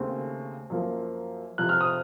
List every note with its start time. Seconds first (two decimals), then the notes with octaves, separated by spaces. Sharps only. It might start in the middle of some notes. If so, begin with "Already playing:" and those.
Already playing: D#2 C#3 A3 C4
0.70 F#2 F3 A#3
1.58 F2 C3 F3 F#6
1.69 F6
1.81 D#6